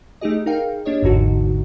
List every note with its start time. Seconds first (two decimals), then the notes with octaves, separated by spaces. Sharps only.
0.21 A3 D#4 G4 G#4 D#5
0.46 D#4 G#4 A#4 F5 G5
0.85 A#3 D4 G4 C#5 D#5
1.02 G#1 E2 G#2 D3 D#4 F#4